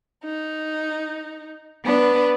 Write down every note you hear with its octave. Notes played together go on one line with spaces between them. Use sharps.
D#4
B3 D4 B4